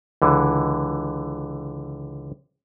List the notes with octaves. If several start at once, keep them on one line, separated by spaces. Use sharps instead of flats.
C#2 D3 E3